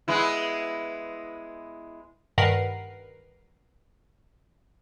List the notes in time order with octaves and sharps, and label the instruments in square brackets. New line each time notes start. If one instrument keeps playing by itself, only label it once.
[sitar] G#3 B3 E4
[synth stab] G2 D#3 A#4 B4 F#5 C7